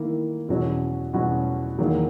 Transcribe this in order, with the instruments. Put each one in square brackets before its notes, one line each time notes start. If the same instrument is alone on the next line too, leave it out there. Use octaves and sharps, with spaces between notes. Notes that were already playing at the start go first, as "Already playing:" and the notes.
Already playing: [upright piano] D#3 A#3 E4
E2 B2 F#3 C#4 F#4
E2 B2 F#3 C#4 F#4
E2 D#3 F#3 A#3